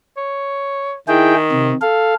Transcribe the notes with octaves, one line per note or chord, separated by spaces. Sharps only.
C#5
D#3 E4 G#4 G5
C3
A4 F5